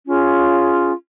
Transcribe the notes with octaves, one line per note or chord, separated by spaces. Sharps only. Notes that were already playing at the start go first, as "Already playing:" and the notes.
C#4 F4 G#4